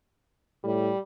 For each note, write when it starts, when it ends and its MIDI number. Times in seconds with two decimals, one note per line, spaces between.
0.64 0.91 45
0.64 0.99 55